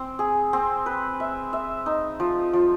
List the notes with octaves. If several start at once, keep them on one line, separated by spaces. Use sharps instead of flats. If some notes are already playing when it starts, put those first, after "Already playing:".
Already playing: C4
G#4
C4
B4
E5
E5
D#4
F3
F3